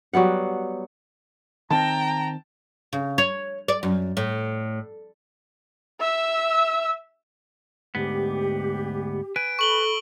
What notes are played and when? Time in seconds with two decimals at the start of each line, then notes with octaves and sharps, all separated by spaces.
0.13 F#3 G3 B3 F#5
1.71 D#3 C4 G5 A5 A#5
2.93 C#3
3.18 C#5
3.68 D5
3.83 F#2
4.17 A2
6.00 E5 E6
7.95 D2 G#2 B3 G4
9.36 B4 G#5 D7
9.59 A4 B5 C#6 F#7 G7